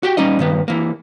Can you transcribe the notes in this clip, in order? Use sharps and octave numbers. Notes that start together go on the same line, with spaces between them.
F#4 G4 G5
G3 C#4 D#4 D#5
G2 D#3 B3
E3 A#3